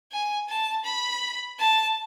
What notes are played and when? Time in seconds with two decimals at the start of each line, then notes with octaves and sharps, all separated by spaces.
0.12 G#5
0.49 A5
0.85 B5
1.59 A5